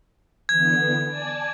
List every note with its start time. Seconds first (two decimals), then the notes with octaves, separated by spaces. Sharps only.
0.49 D3 E3 B3 G#6
1.06 D5 G#5 A5